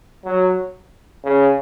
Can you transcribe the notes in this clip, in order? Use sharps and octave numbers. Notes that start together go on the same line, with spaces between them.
F#3
C#3